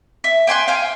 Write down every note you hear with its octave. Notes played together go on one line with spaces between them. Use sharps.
E5
G5 G#5 C6 F#6
F5 G5 G#5